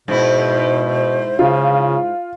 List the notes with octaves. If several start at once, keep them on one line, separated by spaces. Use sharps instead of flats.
G#2 B2 E4 C5
C#3 F4